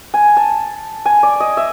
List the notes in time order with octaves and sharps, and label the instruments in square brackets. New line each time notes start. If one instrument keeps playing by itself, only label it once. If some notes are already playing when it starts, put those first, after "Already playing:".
[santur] G#5
A5
G#5
D5
D#5
E5